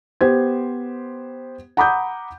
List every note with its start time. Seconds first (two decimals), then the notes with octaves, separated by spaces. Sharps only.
0.21 B3 G4 C5 G#6
1.77 F#5 A#5 B5 D6 D#6 G6